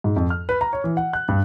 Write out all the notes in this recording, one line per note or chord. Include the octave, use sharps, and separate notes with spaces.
G#2
F2
F6
B4
A#5
C#5
E3
F#5
F#6
G2